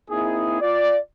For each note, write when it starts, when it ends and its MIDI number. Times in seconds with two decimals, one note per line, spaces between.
0.10 0.58 58
0.10 0.58 60
0.10 0.58 63
0.10 0.58 64
0.10 0.58 68
0.61 0.98 65
0.61 0.98 74